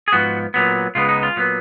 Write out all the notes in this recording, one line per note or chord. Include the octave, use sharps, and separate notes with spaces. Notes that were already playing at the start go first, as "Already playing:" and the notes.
G#4
G#2 F3 B3 F#4
A#2 F#3 B3
C#2 C#3 G#3 B3 F4
D#4
F4
A#2 F#3 B3